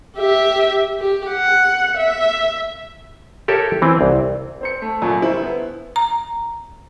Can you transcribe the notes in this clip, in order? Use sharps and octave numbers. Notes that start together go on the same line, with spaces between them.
G4 E5
G4
F#5
E5
G4 A4 A#4 C#5 E5
E3 C4
C2
C4 C5 C#7
A3
F#2 A#2 C#6
G1 C4 E4 C5
B3
A#5